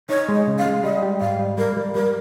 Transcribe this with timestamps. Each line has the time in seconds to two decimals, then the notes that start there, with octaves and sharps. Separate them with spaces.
0.09 D#4 C#5
0.28 G#3
0.35 D#5
0.47 C#3
0.58 F5
0.66 G#3
0.83 G3 D#5
1.03 G4
1.21 G#2 F5
1.39 G3
1.57 G3 A#4
1.77 G3
1.95 G3 A#4